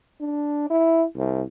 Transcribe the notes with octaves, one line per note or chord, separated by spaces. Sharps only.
D4
E4
C2